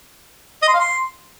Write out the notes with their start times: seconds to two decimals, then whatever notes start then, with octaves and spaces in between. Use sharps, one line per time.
0.62 D#5
0.68 C6
0.74 F5
0.80 C6